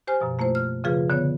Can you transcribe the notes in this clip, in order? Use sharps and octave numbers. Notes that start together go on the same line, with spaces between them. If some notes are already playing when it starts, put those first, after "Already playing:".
G4 C5 G#5 F6
F#2 B2 F3
A3 A#3 E4 F4 C5
F6
C#3 F3 F4 G#4 B4
D3 B3 C#5